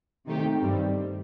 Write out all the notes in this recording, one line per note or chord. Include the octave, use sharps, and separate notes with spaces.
C3 D#3 A3 D#4 G4
G2 D#3 G3 C4